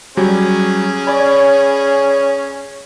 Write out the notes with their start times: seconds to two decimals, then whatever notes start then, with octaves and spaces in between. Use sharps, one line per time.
0.17 F#3 G3 C#4 G4 G#4
1.07 C#5 D5 G#5 B5